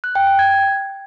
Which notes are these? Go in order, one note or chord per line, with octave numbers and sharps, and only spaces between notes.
F#6
G5
G5
G#6